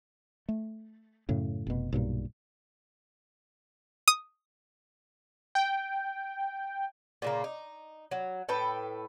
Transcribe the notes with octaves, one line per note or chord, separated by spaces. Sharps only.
A3
F#2 A2 C#3
F1 B2
B1 G2 A#2
D#6
G5
A#2 C#3 A#3
D#4
F#3
A2 A4 B4 G5